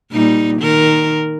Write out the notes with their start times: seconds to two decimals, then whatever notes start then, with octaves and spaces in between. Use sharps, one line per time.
0.12 A#2 G3 D#4
0.60 D#3 A#4